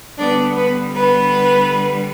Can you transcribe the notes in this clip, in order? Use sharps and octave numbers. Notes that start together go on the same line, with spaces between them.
D3 G3 B3 D4 D5
B3 B4
B3 B4